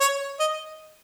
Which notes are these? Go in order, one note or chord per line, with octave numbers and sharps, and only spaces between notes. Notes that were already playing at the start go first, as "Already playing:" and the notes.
C#5
D#5